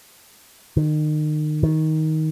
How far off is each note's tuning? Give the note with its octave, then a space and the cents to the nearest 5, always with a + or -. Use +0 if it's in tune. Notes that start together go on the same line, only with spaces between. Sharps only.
D#3 -35
D#3 +15